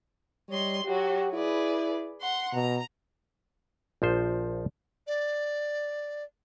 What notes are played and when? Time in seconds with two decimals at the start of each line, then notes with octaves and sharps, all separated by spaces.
0.49 G3 C#5 D#5 C6
0.84 F#3 F#4 G4
1.33 E4 G#4 B4 D5
2.20 F#5 C6
2.54 B2 A#5
4.02 A#1 F3 C5
5.07 D5